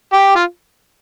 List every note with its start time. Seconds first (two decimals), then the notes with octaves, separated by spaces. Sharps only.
0.13 G4
0.36 F4